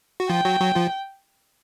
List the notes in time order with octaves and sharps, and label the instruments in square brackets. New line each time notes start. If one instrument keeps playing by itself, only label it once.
[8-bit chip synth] F#4
[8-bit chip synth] F3 F4 [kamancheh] G5
[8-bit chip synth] F#3 F#4
F#3 F#4
F3 F4